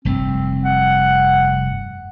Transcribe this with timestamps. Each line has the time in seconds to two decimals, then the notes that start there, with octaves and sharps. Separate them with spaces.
0.05 F1 G2 A3 C4
0.65 F#5